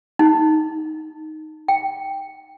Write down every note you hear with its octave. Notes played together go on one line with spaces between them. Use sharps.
D#4
G5